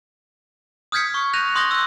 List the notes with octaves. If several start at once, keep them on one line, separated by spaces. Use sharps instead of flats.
D#6 F6 G6 G#6 B6 C#7
C#6
F#6 G6 A#6 D#7 F7
C6 D#6 F#6 G6 A#6 G7
E6 G6